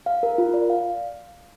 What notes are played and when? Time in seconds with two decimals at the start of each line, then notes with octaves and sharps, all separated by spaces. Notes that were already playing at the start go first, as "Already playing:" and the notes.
0.06 F5
0.23 A#4
0.38 F4
0.54 D5
0.70 F5